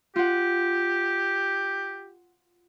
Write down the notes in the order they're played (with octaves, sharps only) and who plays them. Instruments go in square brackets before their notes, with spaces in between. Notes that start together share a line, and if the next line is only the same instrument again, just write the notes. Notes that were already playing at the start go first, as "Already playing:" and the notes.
[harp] F4 F#5 [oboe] G4